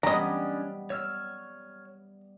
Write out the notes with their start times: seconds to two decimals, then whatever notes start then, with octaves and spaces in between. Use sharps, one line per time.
0.03 G3 B3 C#4 D4 D#5 A#5
0.90 C#5 E6 F6